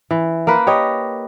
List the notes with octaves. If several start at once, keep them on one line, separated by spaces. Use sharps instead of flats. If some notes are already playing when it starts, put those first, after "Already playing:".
E3
A#3 A#4 B4
G4 C#5 D#5